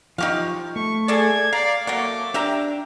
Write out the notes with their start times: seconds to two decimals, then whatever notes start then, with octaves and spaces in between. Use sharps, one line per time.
0.18 F3 D#4 G4 F5 C#6
0.76 A3 C#6
1.08 G#4 A4 D5 G#6
1.53 D5 F5 A#5
1.87 F#3 A3 A#3 C#5 D6
2.34 D4 G4 E5 A#5